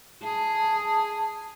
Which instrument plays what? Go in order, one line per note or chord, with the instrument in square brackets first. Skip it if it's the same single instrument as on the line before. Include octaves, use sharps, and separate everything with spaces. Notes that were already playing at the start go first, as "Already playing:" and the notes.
[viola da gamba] G#4 [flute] A5